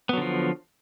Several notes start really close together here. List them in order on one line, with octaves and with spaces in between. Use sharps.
B3 F#3 D3 F3